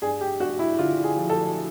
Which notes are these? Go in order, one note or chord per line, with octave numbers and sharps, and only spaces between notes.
G2 G#4
G4
G2 F#4
E4
D3 F4
G#4
F3
A4